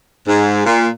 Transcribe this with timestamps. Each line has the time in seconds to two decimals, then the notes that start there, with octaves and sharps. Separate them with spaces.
0.27 G#2
0.66 A#2